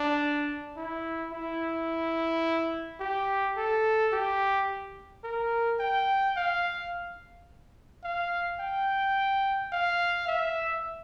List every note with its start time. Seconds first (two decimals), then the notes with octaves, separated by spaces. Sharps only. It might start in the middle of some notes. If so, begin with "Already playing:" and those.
Already playing: D4
0.76 E4
1.33 E4
3.00 G4
3.56 A4
4.12 G4
5.24 A#4
5.79 G5
6.37 F5
8.04 F5
8.59 G5
9.72 F5
10.27 E5